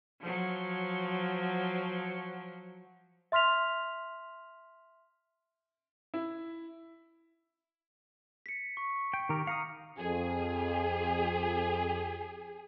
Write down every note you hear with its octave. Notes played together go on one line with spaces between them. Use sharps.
F3 F#3
E5 C6 F6 B6 F7
E4
B6 C#7
C#6
G5
D#3 G4 A#4
F5 A#5 D#6 C#7
F2 G#4